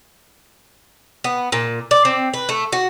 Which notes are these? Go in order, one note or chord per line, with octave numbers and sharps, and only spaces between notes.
B3
A#2
D5
C4
B4
A3
F#4